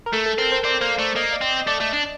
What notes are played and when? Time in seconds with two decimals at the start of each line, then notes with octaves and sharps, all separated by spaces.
0.06 A#4
0.13 A3 A4
0.26 A4
0.38 C4 A#4
0.52 C5
0.64 C4 D5
0.81 A#3 C5
0.99 A3 D5
1.16 A#3 D#5
1.33 D5
1.41 C4
1.51 D#5
1.67 A3 D5
1.80 A3
1.93 D4